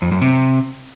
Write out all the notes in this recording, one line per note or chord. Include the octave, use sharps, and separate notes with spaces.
F2
F#2
C3